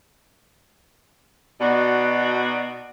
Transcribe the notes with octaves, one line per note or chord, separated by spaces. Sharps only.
B2 D#4 F#4 D5